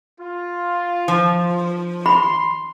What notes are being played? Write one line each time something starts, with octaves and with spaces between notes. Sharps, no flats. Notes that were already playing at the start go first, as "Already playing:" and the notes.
F4
F3
B5 C6